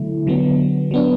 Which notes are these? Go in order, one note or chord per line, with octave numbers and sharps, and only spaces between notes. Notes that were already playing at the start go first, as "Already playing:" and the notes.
Already playing: D3 F#3 A3 E4
D3 F#3 B3
F#3 B3 D4